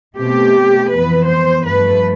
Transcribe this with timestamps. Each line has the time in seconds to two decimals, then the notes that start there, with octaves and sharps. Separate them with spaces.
0.17 B2 A3 C4 G4
0.91 F2 E3 B3 B4
1.27 C5
1.64 G2 F3 A3 B4